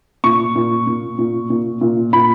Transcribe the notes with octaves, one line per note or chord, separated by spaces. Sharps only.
A#2 C#6
A#2
A#2
A#2
A#2
A#2
A#2 B5